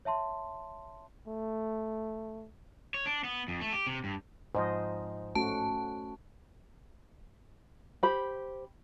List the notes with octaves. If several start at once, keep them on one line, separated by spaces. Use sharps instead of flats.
C#5 E5 A5 C6
A3
C#5
D4
B3
F2
A3
G4
C3
G2
G#2 F3 C5 D#5
A3 C#4 F#4 A5
G4 C5 B5